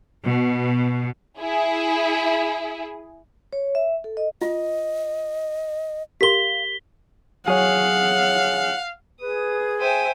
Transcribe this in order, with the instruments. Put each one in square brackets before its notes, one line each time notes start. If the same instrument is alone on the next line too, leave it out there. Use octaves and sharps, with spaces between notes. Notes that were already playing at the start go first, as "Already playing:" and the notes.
[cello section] B2
[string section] E4 G#4
[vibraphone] C#5
E5
A4
D#5
[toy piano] F4 [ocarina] D#5
[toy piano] G4 A#4 C6 [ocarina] F5 [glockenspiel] B6 G7
[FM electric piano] F#3 C#5 [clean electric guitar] G#4 [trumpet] F5 [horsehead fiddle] F#5
[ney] G#4 [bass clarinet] B4 [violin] D#6
[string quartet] C5 E5 G#5 [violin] G5 D#7